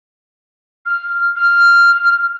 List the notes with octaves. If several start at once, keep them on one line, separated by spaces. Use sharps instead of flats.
F6
F6